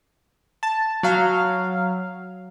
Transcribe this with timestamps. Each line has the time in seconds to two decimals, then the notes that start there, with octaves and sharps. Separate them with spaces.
0.63 A5
1.03 F#3 F5